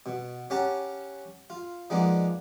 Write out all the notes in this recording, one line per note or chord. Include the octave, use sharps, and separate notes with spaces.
B2
C#4 G4 F#5 A5 A#5
F4
F3 G#3 A#3 B3 D4 D#4